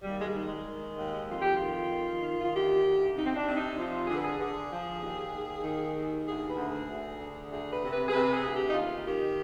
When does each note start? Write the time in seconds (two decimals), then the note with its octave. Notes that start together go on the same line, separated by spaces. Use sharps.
0.03 D#2 G3
0.19 G#3
0.23 G3
0.34 D#3
0.45 G#3
0.65 D#3
0.96 D#2
1.27 F2 F4
1.41 G4
1.55 D#3 F4
1.90 D#3
2.21 D#3
2.41 F4
2.52 D2 G4
2.83 D2
3.14 C3 D#4
3.26 C4
3.35 D4
3.46 C3
3.56 D#4
3.76 F3 F4
4.07 D3 G#4
4.16 B4
4.25 G#4
4.38 D3 G#4
4.70 F3
5.01 D#2
5.32 D#2
5.64 D#3
5.94 D#2
6.25 D2 G#4
6.46 B4
6.56 D2
6.67 G#4
6.87 D2
7.19 D3
7.50 D2 G#4
7.70 B4
7.81 C3
7.92 B4
8.08 G#4
8.12 C3 B4
8.33 G#4
8.43 D2
8.53 G4
8.65 D#4
8.74 D#2 F4
9.05 D#3 G4